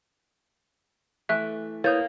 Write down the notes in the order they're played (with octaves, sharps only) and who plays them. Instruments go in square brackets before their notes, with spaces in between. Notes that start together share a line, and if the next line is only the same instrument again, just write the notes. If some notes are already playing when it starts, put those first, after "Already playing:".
[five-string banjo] E3 A3 [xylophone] E5 F#6
[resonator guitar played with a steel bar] A#3 [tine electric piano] E4 B4 D#6 [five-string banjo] C#5 [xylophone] G6 A6